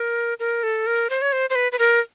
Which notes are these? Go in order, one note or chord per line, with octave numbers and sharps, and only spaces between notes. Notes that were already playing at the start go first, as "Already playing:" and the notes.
Already playing: A#4
A#4
A4
A#4
C5
C#5
C5
C5
B4
B4
A#4